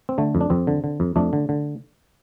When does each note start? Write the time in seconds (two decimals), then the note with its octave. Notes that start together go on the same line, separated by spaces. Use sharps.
0.09 C4
0.18 D3 A3
0.35 F2
0.41 D4
0.50 F2 C4
0.67 D3
0.84 D3
1.00 F2
1.16 F2 A3 D4
1.33 D3
1.49 D3